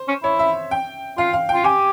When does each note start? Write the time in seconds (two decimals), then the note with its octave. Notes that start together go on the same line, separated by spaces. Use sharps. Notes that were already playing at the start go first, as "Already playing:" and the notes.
Already playing: C5
0.08 C#4
0.23 E4 C#5
0.39 E5
0.71 G5
1.18 F4 F5
1.33 F5
1.49 G5
1.54 F4
1.64 G4 G#5